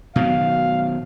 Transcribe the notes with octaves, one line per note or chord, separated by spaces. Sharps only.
B2 D#3 F#3 F5